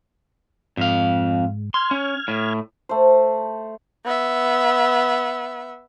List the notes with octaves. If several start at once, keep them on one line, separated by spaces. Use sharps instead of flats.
F2 G#2 F5
C6 F6 G#6
C#4
A2
A3 C5
B3 E5